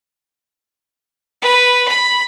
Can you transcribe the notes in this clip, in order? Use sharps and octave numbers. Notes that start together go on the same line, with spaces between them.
B4
B5